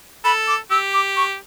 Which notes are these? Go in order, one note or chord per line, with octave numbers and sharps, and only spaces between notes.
A4 B5
D6
G4 E6
D6
C#6